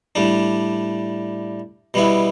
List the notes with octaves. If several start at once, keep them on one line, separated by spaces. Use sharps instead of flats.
A2 G3 D4
B2 G3 B3 E4